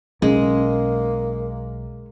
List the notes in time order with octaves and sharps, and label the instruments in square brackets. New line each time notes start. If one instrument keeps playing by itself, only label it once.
[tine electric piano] B1 [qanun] G#3 [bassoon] A#3 [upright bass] C#4